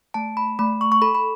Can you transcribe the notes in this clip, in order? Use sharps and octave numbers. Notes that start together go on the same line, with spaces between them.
A3 A5
B5
A3 B5
C#6
C#6
A4 B5
B5